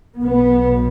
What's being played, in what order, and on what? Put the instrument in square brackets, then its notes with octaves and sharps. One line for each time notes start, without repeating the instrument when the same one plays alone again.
[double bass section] B1 B2 B3